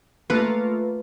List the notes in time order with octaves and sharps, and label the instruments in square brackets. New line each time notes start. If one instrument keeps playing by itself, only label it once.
[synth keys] A3 A#3 F4 [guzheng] B4